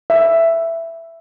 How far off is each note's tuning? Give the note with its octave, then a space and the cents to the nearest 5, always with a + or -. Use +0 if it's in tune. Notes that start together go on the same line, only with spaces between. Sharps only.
E5 +10